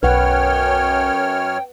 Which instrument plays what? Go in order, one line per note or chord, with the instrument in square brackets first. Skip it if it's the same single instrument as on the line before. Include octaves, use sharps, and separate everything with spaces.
[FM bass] B1 [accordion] F#2 C#5 F6 [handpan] B4 F#5 [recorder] G5